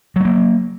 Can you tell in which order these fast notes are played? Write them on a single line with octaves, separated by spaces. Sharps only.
F#3 A3 A#3